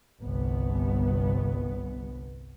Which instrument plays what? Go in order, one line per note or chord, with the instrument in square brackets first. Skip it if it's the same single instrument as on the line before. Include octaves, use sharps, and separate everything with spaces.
[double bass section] G1 C2 B3